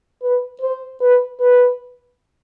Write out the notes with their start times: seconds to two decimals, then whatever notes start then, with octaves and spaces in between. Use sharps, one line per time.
0.22 B4
0.61 C5
1.01 B4
1.40 B4